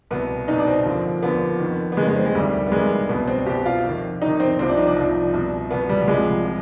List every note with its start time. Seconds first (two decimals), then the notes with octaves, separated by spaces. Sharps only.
0.11 C2 B2 B3
0.48 C2 B2 D#4
0.58 D4
0.67 C4
0.86 D#2 D3 F3
1.23 D#2 D3 F3 B3
1.60 F2 D#3
1.92 B3
1.97 F2 D#3 G#3
2.07 G#3
2.16 C4
2.26 G#3
2.35 D2 C3 D#3 G3
2.67 B3
2.72 D2 C3 D#3 G#3
3.09 C2 B2 B3
3.28 C4
3.46 C2 B2 G4
3.66 F4
3.84 F2 C3 D#3
4.21 F2 C3 D#3 D#4
4.40 C4
4.59 C2 C3 F3 C4
4.69 D4
4.77 D#4
4.87 D4
4.96 C2 C3 F3
5.34 C2 B2
5.71 C2 B2 B3
5.89 G3
6.01 G3
6.08 C2 C3 F3 G#3
6.45 F3